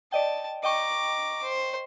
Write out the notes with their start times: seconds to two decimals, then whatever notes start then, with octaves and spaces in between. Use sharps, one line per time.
0.12 D5 D#5 G5 A5
0.64 D#5 G5 A#5 C#6 D6
1.43 C5